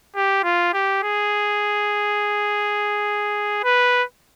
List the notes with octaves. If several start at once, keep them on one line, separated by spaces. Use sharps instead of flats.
G4
F4
G4
G#4
B4